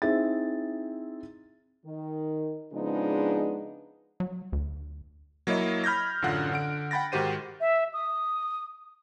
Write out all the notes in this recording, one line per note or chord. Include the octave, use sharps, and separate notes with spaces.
C4 D#4 E4 G#4 E5 A6
D#3
C#3 F3 G#3 B3 D4 D#4
F#3
D2
F#3 A#3 E4 C#5 D#5
B5 F6 G6 G#6 A#6
A1 F#2 D3 F4 F#5 F#6
D3 F#5 D7
F#5 G5 B5 A6 A#6
G#2 D#3 F#4 G4 C5 D#7
E5
D#6